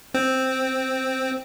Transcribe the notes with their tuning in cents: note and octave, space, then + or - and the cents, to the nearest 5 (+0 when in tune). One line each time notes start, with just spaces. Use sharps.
C4 +0